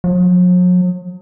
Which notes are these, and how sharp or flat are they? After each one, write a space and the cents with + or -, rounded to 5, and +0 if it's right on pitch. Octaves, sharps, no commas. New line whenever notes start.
F#3 -45